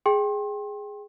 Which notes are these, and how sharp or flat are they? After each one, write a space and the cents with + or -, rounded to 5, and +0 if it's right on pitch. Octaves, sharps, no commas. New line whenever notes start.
G#4 +0 G5 +0 C6 +35